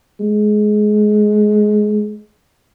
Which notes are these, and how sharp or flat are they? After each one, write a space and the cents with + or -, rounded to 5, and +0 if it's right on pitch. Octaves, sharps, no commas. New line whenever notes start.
G#3 +20